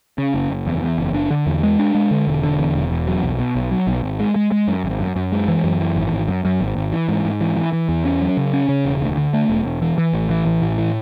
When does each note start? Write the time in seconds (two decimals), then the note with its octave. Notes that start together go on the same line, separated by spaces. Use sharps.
0.18 C#3
0.34 F#1
0.50 F#1
0.67 E2
0.83 E2
0.98 F#1
1.14 D4
1.31 D3
1.46 E2
1.63 G#3
1.79 D4
1.95 G#3
2.11 D3
2.27 E1
2.43 D3
2.59 E2
2.75 E1
2.91 E2
3.07 F#3
3.23 B1
3.39 B2
3.55 B1
3.71 F#3
3.87 B1
4.04 G#1
4.20 G#3
4.36 G#3
4.52 G#3
4.68 F#2
4.84 G#1
5.00 F#2
5.16 F#2
5.32 G#3
5.48 E3
5.64 F#2
5.80 E3
5.96 G#1
6.12 G#1
6.28 F#2
6.45 F#2
6.61 G#1
6.77 G#1
6.93 E3
7.09 G#2
7.25 G#2
7.41 E3
7.56 E3
7.73 E3
7.89 E2
8.05 C#4
8.21 F#3
8.37 C#3
8.53 C#4
8.69 C#3
8.85 E1
9.01 D2
9.17 D3
9.33 A3
9.49 E1
9.65 E1
9.82 E3
9.98 E3
10.13 A1
10.30 E3
10.46 A1
10.62 A2
10.78 E3